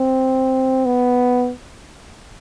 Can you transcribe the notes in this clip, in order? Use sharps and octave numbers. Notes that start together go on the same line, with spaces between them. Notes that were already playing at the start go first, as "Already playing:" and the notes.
Already playing: C4
B3